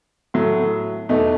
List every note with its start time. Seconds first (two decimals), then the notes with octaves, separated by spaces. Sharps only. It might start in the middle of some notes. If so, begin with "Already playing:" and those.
0.34 A2 F#3 A3
1.09 E2 B2 A3 D#4